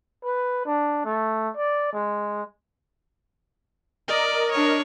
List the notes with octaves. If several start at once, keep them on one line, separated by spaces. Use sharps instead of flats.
B4
D4
A3
D5
G#3
A#4 D5 D#5
D4 C#5